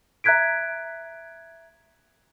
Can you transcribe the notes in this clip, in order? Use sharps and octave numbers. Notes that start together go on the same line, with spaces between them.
E5 A#5 F#6 G#6 B6 D7